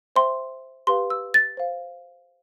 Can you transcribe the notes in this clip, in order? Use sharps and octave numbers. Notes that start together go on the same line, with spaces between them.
C5 E5 G5 C6
G4 B4 F5 C6
E6
A6
C5 F5